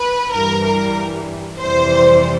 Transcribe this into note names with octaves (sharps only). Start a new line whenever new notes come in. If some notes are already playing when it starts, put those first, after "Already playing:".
Already playing: B4
G2 E3 G3 A#4
A#4
F2 C3 E3 G3 C5